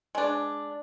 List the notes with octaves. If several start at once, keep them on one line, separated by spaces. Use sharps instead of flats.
G#3 D4